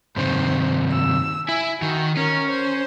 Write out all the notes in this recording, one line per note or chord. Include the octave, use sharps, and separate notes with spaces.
G2 C3 D#3 C5
E6
E4 G#5
D#3 F#4
C#4 A#4
C5